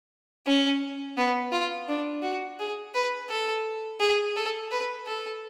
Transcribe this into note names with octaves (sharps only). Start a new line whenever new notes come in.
C#4
B3
F4
D4
F#4
G#4
B4
A4
G#4
A4
B4
A4